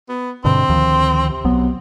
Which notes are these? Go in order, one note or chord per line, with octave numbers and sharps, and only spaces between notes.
B3
G2 B2 D3 C4
D2 D#3 F3
C3
B1 F#3 B3